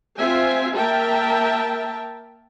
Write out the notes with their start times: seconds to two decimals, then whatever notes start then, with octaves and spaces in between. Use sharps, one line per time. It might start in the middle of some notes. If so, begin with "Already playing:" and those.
0.18 C4 F4 E5 G#5
0.76 A#3 A#4 E5 G5 A5